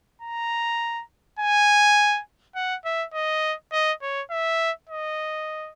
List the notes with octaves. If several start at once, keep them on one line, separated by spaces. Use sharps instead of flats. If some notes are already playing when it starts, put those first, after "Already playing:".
A#5
G#5
F#5
E5
D#5
D#5
C#5
E5
D#5